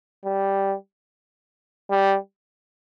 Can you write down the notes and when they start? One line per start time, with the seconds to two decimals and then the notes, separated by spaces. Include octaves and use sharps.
0.25 G3
1.90 G3